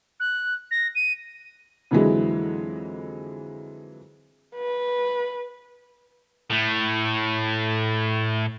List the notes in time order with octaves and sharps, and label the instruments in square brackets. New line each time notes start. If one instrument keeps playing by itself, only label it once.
[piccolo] F#6
A#6
D#7
[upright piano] F2 D3 E3 F#3 G#3
[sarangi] B4
[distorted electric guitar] A2 A3